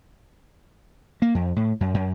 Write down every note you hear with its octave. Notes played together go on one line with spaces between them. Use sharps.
A#3
F2
A2
F#2
F#2